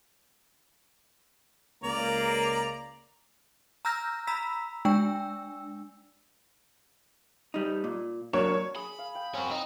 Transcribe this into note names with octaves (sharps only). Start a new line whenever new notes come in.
C#2 A#3 D5 A#5
A#5 E6 F6 G6 A#6
A#5 B5 E6 B6
G#3 D4 G5 E6
G3 D#4
A#2
F#3 A#3 D4 C#5
G#4 B5
F5
G5
C4 C#4 F#4
D#4